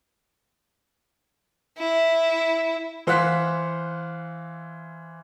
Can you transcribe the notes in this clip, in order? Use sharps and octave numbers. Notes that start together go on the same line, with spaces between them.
E4
E3 C5 F5 F#5 F#6 B6